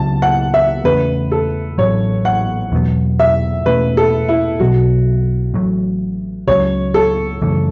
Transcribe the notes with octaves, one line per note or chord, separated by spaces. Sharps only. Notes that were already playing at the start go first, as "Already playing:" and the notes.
Already playing: C#2 C#3 F#3 A5
F#5
E5
E2 C#3 A3 C#4 B4
A4
A1 A2 F#3 C#5
F#5
E2 B2 F#3 B3
E5
E2 B2 A3 C#4 B4
A4
E4
B1 B2 F#3 F#4
A1 A2 F#3 A3
C#2 C#3 F#3 C#5
A4
F#2 C#3 E3 A3